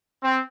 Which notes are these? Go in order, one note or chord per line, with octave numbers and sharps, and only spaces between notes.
C4